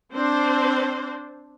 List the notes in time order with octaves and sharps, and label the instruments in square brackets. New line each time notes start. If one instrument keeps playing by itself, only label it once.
[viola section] C4 D4 C5